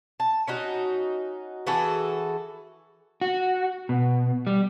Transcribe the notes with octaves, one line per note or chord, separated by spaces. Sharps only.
A5
C#4 D#4 F#4
E3 F#4 G#4 A4
F#4
B2
G3